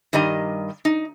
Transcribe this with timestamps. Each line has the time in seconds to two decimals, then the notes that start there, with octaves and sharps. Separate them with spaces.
0.13 G2 D#3 G3 D#5 A#5
0.85 D#4